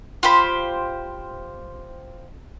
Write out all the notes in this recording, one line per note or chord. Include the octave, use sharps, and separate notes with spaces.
F4 G4 C5 B5